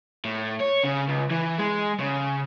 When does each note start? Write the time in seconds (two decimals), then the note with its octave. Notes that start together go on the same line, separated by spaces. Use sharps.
0.25 A2
0.60 C#5
0.83 C#3
1.08 C#2
1.30 E3
1.58 G#3
2.00 C#3